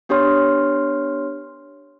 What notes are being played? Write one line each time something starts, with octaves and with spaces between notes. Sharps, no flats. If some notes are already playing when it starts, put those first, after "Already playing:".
B3 D4 G4 C#5 C6 F6